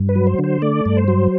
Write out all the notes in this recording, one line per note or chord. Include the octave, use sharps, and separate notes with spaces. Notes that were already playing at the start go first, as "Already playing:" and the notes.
Already playing: G2
B4
F#3
C5
D3
C5
A3 D5
G2
C5
F#3